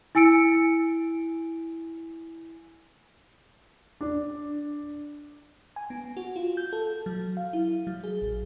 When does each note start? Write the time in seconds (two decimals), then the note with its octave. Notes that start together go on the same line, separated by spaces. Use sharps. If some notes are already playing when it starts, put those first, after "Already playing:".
0.15 E4 G#5 E6 C#7 D7
4.01 D4
5.76 G#5
5.90 B3
6.17 F#4
6.36 F4
6.57 G6
6.73 A4
7.06 F#3
7.37 F5
7.53 E4
7.87 F#3
8.04 G#4
8.22 A1